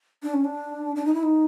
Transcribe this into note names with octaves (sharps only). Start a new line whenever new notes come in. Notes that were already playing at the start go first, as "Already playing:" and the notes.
D4
C#4
D4
D4
D#4
E4
D#4